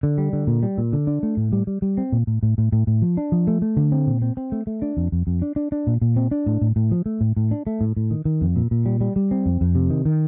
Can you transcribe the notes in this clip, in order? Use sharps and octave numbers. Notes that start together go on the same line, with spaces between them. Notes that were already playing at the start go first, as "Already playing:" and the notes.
D3
G3
D3
A#2
G3
A#2
D3
D4
A3
A2
G3
G3
G3
C4
A#2
A2
A2
A2
A2
A2
F3
D4
F3
A3
A3
D3
C4
A#2
C4
C4
A3
A3
D4
F2
F2
F2
D4
D4
D4
A#2
A#2
C4
D4
A2
A2
A2
F3
A3
A2
A2
D4
A3
A2
A2
D#3
D#3
F2
A#2
A#2
G3
G3
G3
C4
F2
F2
C3
D#3
D#3